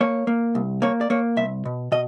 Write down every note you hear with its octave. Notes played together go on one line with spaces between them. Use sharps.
A#3 C#5
A#3
C2
A#3 C#5
D5
A#3 C#5
C2 E5
B2
B2 D#5